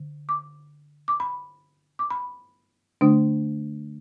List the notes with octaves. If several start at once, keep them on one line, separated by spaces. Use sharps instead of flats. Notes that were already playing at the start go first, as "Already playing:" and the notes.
Already playing: D3
D6
D6
B5
D6
B5
D3 A3 D4